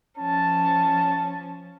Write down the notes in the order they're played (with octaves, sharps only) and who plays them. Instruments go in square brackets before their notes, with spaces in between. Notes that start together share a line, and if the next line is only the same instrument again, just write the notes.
[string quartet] F3 C#4 [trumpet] A5